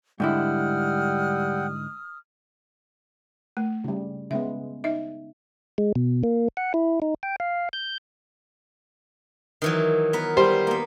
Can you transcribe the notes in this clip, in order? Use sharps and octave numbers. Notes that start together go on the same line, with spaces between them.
G#2 D3 G3 E4 F#5 G5 D#6 F6
A3
C#3 G3
C#3 G#3 B3 E5
D#4 D#5 E5
G#3
B2
A#3
F#5
E4
D#4
G5
F5
G6
D#3 E3 F#3
B3 A#4 B4
G3 C5
A#3 B3